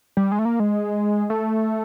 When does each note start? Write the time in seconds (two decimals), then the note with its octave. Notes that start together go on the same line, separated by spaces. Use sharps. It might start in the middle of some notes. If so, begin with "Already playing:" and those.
0.17 G3
0.32 G#3
0.39 A3
0.45 A#3
0.60 G#3
1.30 A3